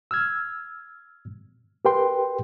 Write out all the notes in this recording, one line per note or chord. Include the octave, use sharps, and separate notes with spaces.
E6 F6 G#6
G4 A#4 B4 G5 C6